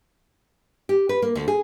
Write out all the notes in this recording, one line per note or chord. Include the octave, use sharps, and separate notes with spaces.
G4
B4
A#3
D2
G#4